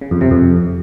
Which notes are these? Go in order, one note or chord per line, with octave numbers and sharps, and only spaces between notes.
C#3
F2
C3
F2